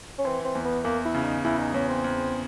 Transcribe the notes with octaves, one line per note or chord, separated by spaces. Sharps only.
C#4
E3 C4
C4
E2
B3
E2 A#3
E4
C#3
D#4
E2 E4
D#4
E2 C#4
C4
E2